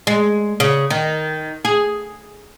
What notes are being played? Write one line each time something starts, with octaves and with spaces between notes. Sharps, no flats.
G#3
C#3
D#3
G#4